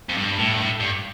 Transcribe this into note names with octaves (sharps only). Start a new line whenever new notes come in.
F2
G2
A2
G2
A2
G2